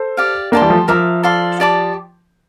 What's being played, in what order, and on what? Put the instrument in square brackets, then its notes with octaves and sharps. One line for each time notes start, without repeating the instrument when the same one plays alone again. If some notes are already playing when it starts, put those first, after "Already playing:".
Already playing: [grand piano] A4 C5
[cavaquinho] G4 D5 F5
[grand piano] A#3 D4 [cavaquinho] G4 D5 A5 C6
[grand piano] E3 G3
F3 A3
[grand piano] F3 [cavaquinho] A#4 E5 A#5 D6
[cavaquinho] A4 D5 F5 C6
G4 D5 A5 D6